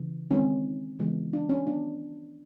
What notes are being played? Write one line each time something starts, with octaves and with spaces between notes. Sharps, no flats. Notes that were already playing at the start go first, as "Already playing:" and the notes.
Already playing: C#3 E3
D#3 G#3 C4 C#4
C#3 E3 G#3 B3
D4
C#4
D#3 F#3 B3 D4